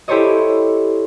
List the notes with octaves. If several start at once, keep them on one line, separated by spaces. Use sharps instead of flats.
E4 G4 A4 C5 C#5 D#5